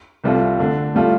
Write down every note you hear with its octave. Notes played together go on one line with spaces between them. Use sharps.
C2 C3 G3 F4 A4
D3 A3 D4
A2 G3 F4 A4